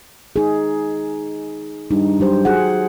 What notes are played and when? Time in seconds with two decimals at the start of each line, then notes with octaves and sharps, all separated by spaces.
0.36 D#4 G#4
1.91 G2 D#4
2.20 F#3 G4 C5
2.45 F#4 G#4 F#5